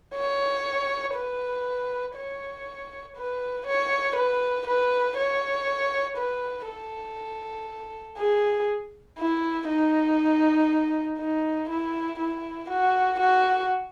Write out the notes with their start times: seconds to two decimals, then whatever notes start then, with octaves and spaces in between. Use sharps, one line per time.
0.16 C#5
1.15 B4
2.15 C#5
3.16 B4
3.67 C#5
4.16 B4
4.67 B4
5.17 C#5
6.18 B4
6.68 A4
8.19 G#4
9.19 E4
9.69 D#4
11.19 D#4
11.70 E4
12.19 E4
12.70 F#4
13.20 F#4